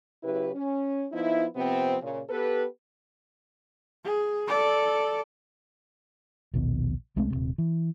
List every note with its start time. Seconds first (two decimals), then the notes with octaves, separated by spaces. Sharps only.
0.23 C#3 F#3 E4 G4 B4
0.55 C#4
1.12 F3 B3 D#4 E4
1.56 C3 F3 B3 C4
2.01 A#2 C#3
2.30 B3 G4 A4 B4
4.04 G#4
4.48 A4 D5
6.54 A#1 D#2 B2
7.16 C2 G#3 A3 C4
7.30 D#1 G#1 C3
7.58 E3